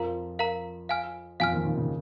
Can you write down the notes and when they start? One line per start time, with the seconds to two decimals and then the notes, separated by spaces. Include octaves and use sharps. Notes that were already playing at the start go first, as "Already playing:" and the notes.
Already playing: F2 F3 A#4 F5 A#5
0.39 A#4 F5 A#5
0.89 F5 G#5 F6
1.40 F2 F3 F5 G#5 F6
1.52 D#2 D#3
1.65 D#2 D#3
1.78 C#3